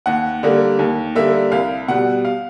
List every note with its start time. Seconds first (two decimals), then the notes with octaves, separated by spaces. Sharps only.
0.06 D#2 F#5
0.43 D3 G3 A#3
0.79 D#2
1.15 D3 G3 A#3 E5
1.52 C2 F5
1.88 B2 G3 F#5
2.25 F5